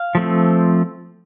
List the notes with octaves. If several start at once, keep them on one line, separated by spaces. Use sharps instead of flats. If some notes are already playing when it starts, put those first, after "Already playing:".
Already playing: F5
F3 A3 C4